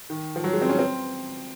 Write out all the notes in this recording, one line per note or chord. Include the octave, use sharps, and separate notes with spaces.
D#3
F3
F#3
G#3
C4
C#4
C4